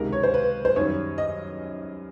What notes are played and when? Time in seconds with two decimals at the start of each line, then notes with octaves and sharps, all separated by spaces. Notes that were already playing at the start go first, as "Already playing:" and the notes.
Already playing: C#2 C3 D#3 G#3 A#4
0.13 C#5
0.23 C5
0.34 B4
0.65 C5
0.76 F#2 D#3 G3 C#5
1.18 D#5